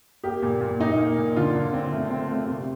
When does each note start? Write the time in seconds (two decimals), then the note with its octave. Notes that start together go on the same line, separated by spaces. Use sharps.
0.24 A#3 G4
0.42 A#2
0.61 A#2
0.79 A#2 D#4
0.98 A#3
1.17 A#2
1.36 D3 F4
1.55 D3
1.73 C4
1.92 A3
2.10 C4
2.28 A3
2.47 C3